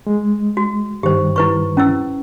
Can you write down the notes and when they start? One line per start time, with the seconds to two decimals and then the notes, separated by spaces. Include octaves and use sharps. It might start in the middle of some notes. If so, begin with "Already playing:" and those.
0.07 G#3
0.57 F#4
1.03 G2 D#3 G3 G4 C5
1.36 E4 B4 C#6
1.77 C#4 E4 E6